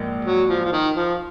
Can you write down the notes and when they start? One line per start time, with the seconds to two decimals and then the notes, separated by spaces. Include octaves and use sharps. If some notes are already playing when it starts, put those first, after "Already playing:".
Already playing: A#1 G#2 A#3
0.25 F#3
0.49 F3
0.65 F3
0.73 D#3
0.96 F3